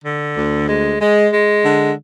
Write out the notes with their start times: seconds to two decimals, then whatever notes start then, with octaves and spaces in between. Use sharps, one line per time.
0.04 D3
0.36 D2
0.67 G#3
1.00 G#3
1.32 G#3
1.64 D3